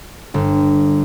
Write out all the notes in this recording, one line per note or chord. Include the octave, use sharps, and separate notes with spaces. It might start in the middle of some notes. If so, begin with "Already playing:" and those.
G1